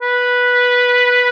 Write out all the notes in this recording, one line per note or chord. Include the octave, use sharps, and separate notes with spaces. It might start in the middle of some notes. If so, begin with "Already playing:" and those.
B4